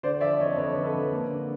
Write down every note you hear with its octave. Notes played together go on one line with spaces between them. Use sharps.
D3 C5 D5
F3 D5 E5
F2 C#5 D#5
F2 B4 C#5
D3
A4 B4
F2
A#3
D3